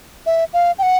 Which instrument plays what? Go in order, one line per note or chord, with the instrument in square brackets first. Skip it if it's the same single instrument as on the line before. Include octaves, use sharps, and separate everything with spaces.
[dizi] E5
F5
G5
F#5